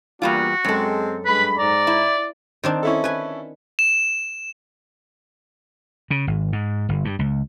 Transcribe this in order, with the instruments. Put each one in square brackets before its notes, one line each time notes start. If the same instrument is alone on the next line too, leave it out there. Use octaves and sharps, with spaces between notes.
[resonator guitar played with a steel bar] E2 G3 F4 [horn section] A#3 D4 [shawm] F#4
[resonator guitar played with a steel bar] F#2 A4 [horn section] G#3 C4
[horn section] G2 G#3 B5 [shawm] B4
[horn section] G#2 A#5 [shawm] D5
[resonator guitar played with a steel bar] E4
[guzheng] D#3 C4 D4
[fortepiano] C#4 E4 A4
[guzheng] B4 G#5
[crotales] E7
[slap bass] C#3
G#1
G#2
G1
G2
C#2